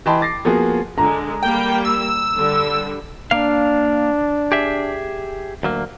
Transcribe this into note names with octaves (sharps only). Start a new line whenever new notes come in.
E3 D#5 G5 A5 B5 C6
D6 A6 A#6 C7
F3 A#3 B3 F#4 G#4
D3 G#3 A#5
G3 A#3 G5
E6
D3 G3
A#3 D4 F5
G4 G#4 E5
D2 F#3 A#3